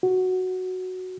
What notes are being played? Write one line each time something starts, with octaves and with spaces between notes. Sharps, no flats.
F#4